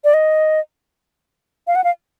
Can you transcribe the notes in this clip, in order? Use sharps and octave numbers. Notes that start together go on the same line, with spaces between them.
D5
D#5
F5
F#5
F5